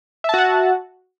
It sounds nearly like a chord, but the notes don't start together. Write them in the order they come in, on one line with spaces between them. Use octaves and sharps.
E5 A5 F#4 F#5